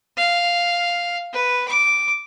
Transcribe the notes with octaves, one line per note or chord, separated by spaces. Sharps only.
F5
B4
D6